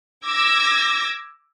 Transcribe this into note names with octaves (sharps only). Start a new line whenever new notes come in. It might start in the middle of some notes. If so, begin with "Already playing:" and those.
D6 E6 G#6 A#6